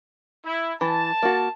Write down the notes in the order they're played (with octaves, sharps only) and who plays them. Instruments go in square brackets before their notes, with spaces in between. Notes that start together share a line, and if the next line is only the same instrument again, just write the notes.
[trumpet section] E4
[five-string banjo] E3 [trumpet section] A5
[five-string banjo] A#3 F#4